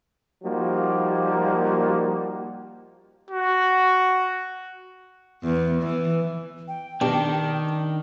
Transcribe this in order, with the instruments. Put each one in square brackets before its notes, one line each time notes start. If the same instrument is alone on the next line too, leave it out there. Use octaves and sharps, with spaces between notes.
[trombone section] F3 G3 A#3 D#4 F#4
[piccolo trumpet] F#4
[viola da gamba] E2
E3
[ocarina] G5
[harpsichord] B2 G4 [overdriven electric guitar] D#3 [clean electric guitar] D4